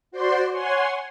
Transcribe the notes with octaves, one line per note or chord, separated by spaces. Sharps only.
F#4 C5 D5 C6
C#5 F#5 G#5 C6